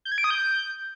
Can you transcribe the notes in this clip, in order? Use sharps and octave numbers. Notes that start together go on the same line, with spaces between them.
G6
G#6
D7
D#6
G6